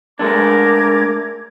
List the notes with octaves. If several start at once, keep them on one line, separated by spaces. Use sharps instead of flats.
G#3 A3 D4 A#4 D6 G#6